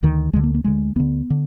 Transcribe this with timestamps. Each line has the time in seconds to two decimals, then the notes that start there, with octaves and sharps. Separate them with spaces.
0.03 D2 D3 D#3
0.33 D2 D3 G#3
0.43 A#3
0.54 A#3
0.64 D2 D3 G#3
0.96 D2 D3 B3
1.30 D3